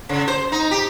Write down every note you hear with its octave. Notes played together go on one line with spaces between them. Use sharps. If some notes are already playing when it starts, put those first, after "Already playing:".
C#3
C5
D#4
G4